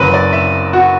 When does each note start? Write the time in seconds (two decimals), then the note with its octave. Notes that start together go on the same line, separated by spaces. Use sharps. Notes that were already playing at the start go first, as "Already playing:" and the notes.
Already playing: F#1 F#2 F#3 B4
0.14 D5
0.33 E5
0.73 F#4